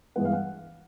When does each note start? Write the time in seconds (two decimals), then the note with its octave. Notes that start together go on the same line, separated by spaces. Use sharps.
0.16 G2 E3 G#3 B3 F#5
0.25 F5
0.33 F#5